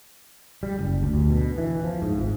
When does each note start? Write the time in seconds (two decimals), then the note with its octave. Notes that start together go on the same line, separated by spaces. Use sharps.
0.63 G3
0.79 F#1
1.03 D2
1.30 B2
1.58 E3
1.84 F3
2.02 G#2
2.17 G#1